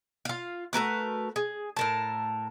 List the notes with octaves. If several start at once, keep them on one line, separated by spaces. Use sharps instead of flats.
F4 F5
A3 F#4 A#4 B4
G#4
A2 A#4 A5